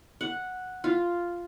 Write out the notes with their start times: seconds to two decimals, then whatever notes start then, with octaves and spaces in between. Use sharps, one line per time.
0.21 F#5
0.84 F4